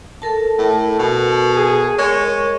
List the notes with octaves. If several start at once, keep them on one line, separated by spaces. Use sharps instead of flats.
A4 A#4 A5
A2
B2
G#4
G#3 A#4 C#5